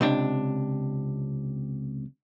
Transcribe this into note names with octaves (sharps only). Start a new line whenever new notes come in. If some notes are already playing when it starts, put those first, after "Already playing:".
C#2 C3 D4